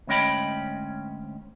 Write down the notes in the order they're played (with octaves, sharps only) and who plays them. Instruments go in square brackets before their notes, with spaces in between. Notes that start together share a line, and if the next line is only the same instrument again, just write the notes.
[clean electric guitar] D2 G#2 C#4 D#5 G5 B5